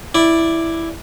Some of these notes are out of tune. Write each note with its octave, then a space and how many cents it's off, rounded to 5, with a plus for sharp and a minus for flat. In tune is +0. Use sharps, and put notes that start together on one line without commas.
E4 +0 D5 +0